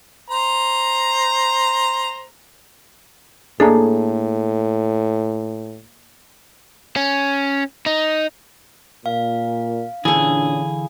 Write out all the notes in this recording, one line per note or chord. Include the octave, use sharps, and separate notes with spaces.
C5 A#5
A2 A#3 D4 G#4 A4
C#4
D#4
A#2 F5
A#2 D3 E3 C#4 D4 G#4